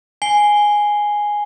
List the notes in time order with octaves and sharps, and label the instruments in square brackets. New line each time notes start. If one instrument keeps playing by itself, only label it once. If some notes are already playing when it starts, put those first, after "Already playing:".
[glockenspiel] G#5 C7 G7